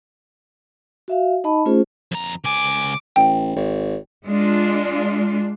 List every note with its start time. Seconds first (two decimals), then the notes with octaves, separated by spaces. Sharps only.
1.08 F#4 E5 F5
1.44 D#4 D#5 A5 B5
1.66 A3 C#4 F4 G#4 C5
2.12 F2 A#5
2.44 C#2 G#5 D6
3.16 A1 G5
3.56 G#1
4.25 G#3 D4 F4